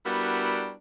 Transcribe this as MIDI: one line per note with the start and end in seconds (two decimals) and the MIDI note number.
0.06 0.73 55
0.06 0.73 59
0.06 0.73 62
0.06 0.73 64
0.06 0.73 66
0.06 0.73 70